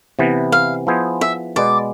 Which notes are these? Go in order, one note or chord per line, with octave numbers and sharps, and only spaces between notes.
C3 E3 B3
F5
F3 B3 E4 G#4 C5
E5
B2 G#3 B3 D5